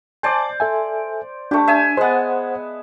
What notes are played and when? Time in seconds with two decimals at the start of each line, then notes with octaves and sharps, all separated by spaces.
0.23 C5 D5 G#5 A5 D6
0.60 A4 E5 G#5
1.51 A3 D4 G4
1.67 E5 G#5
1.97 G#3 B3 C5 F#5